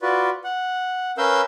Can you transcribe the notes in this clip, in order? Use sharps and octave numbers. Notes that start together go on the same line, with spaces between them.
F4 F#4 B4 D5
F#5
C#4 A#4 B4 F5 E6 G6